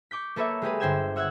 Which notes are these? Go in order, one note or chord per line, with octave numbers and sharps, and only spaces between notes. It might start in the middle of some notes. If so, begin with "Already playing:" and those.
C#6 D6 G6 B6
A#3 A4 B4 C#5 E5
G#3 G4 G#4 B4
G1 D3 C5 G5 G#6 E7
C#5 E5 F#5 E6 F#6 G#6